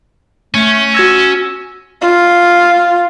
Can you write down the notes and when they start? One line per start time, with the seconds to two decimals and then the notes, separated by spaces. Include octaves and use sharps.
0.54 A3 C#4
0.94 F#4 E6 G#6 A#6
2.02 F4